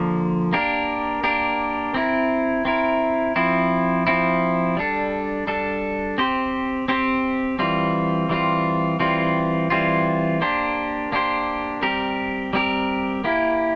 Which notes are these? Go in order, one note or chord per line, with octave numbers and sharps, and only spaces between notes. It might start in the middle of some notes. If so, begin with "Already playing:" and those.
Already playing: D3 F3 A#3
A#3 D4 G4 A#4
A#3 D4 G4 A#4
C4 E4 A#4
C4 E4 A#4
F3 C4 E4
F3 C4 E4
G3 D4 A4
G3 D4 A4
C4 G4 C5
C4 G4 C5
E3 G3 C4 F4
E3 G3 C4 F4
E3 G3 C4 F4
E3 G3 C4 F4
A#3 D4 G4 C5
A#3 D4 G4 C5
G3 C4 G4 A#4
G3 C4 G4 A#4
A#3 E4 G4